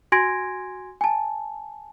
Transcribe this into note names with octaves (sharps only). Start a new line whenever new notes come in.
F#4 G#5 C6 G#6 A#6 D7
G#5 A5